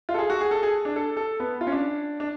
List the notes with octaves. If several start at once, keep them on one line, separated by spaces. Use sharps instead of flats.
F4
A4
G#4
F#4
G#4
A4
G#4
D4
A4
A4
B3
F4
C#4
D4
D4